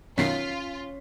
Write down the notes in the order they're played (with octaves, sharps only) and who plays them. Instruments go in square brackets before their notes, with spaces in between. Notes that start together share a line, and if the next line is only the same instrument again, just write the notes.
[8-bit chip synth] F#2 B2 D#3 [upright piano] C#4 B6 C7 [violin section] F4